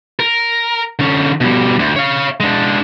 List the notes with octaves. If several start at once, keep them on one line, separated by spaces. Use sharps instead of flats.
A#4
D3 C#4
B2 G3
D2
C#5 F5
G#3 D4